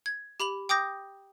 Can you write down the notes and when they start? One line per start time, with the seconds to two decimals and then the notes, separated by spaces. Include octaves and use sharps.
0.06 G#6
0.40 G4 B5 F7 F#7
0.69 G5 D6 D#6 G6 A#6